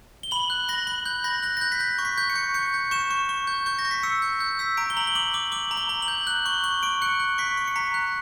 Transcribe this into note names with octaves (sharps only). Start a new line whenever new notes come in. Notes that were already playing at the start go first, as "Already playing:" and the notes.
G7
B5 F#7
F#6
B5 A#6
B5
F#6 G6
B5 A#6
F#6 A#6
A#6
F#6 G6
B6
G6 A#6
C#6
B6
G6
C#7
C#6
G6 C#7
G6
C#6 E7
C#6
C#6
G6
C#6 G6
A#6
C#6
B6
E6 C#7
G6
G6
E6 B6
A#5 D7
G7
A#5 F#7
G7
D6 F#7
D6 F#7
D6 F#7
A#5
G7
A#5
F#7
G6
F#6 F#7
C#6 G7
C#6 G7
C#6 D7
F#6 C#7
F#6
C#6 B6
C#6
C#7
A#5 B6
F#6